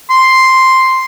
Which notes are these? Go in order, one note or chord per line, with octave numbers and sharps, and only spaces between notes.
C6